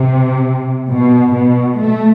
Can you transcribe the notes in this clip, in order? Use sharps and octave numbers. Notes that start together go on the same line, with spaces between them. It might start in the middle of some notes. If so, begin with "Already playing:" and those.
Already playing: C3
B2
B2
A3